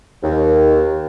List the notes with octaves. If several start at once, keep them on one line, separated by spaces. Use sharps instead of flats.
D#2